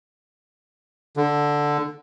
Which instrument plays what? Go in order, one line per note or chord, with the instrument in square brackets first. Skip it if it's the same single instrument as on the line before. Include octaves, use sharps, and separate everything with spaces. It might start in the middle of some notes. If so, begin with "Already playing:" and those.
[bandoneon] D3